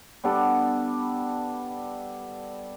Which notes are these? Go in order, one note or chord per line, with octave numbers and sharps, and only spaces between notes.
G3 B3 D4 A4